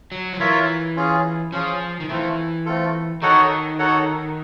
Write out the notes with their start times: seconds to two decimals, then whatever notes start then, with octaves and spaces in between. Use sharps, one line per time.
0.12 F#3
0.33 F3
0.40 E3 F4 A#4 C#5 E5
0.96 C#4 F4 G#4
1.52 F3 C#4 F4 G#4
2.00 D#3
2.09 E3 A3 C4 F4 A4
2.66 A3 C4 F4 A4
3.22 D#3 D#4 F#4 A4 C#5 F#5
3.79 D#4 F#4 A4 C#5 F#5